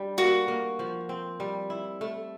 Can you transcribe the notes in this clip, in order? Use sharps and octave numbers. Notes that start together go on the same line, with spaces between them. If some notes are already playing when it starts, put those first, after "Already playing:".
Already playing: G3 D4
A#3 F#4
A#3
F3
C4
G3
E4
A3